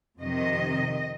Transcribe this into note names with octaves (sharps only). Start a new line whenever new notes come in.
F2 C3 D#3 D#5